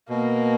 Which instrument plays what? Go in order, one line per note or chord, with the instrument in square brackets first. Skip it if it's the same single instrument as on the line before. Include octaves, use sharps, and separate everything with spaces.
[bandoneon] B2 [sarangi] A#3